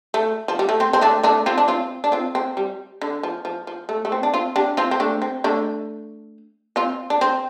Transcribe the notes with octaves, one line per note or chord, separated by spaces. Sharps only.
A3
F3
G3
A3
C4
C4
A3 D4
A3 D4
C4 F4
D4
C4 F4
D4
C4 F4
C4
G3
D3
F3
F3
F3
A3
A3
C4
D4
C4 F4
D4 G4
C4 F4
C4
A3 D4
C4
A3 D4
C4 F4
D4
C4